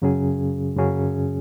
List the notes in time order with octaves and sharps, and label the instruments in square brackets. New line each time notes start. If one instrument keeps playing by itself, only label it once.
[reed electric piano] F#2 C#3 F#3 C#4 G#4
F#2 C#3 F#3 C#4 G#4